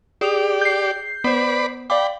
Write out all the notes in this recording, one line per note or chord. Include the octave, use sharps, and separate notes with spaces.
G4 G#4 D5 D#6 F7
G6 C7
B3 B4 C5 D5 B5
D5 F5 G5 B5 D6